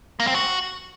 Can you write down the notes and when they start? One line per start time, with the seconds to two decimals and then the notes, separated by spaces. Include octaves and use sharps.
0.20 A#3
0.27 C4
0.35 F#4